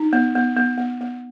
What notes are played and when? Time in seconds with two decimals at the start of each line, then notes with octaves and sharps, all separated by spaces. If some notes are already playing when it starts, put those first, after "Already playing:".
Already playing: D#4
0.13 B3
0.35 B3
0.57 B3
0.78 B3
1.01 B3